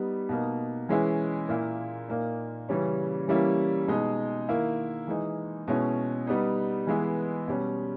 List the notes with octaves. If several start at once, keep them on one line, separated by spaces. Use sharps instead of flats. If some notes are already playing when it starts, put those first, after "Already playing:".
Already playing: G3 B3 D#4
B2 A#3 D#4
E3 G#3 C#4 E4
A#2 A#3 E4
A#2 A#3 D#4
C#3 E3 G3 C#4
E3 G3 A#3 C#4 E4
B2 G#3 D#4
D#3 A#3 E4
E3 G#3 D#4
B2 G#3 C#4 E4
G3 B3 D#4
E3 G#3 B3 E4
B2 G3 C#4